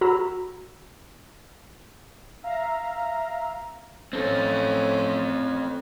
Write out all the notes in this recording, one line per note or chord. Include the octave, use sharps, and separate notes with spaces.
F#4 A#5 B5 E6
E5 F5 A#5
A2 C4 C#4 A4